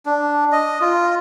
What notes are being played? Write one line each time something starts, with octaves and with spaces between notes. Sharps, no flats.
D4
D#5
F4